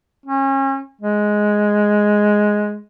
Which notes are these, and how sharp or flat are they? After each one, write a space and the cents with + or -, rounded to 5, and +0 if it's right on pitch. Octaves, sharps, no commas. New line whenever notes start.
C#4 -35
G#3 +5